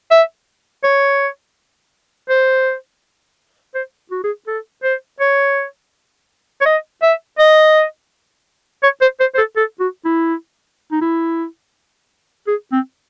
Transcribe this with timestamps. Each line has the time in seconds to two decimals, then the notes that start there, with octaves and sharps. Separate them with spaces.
0.11 E5
0.84 C#5
2.29 C5
3.75 C5
4.11 F#4
4.24 G#4
4.47 A4
4.83 C5
5.20 C#5
6.61 C#5
6.65 D#5
7.02 E5
7.39 D#5
8.83 C#5
9.01 C5
9.20 C5
9.34 C5
9.38 A4
9.56 A4
9.80 F#4
10.05 E4
10.92 D#4
11.01 E4
12.48 G#4
12.72 C4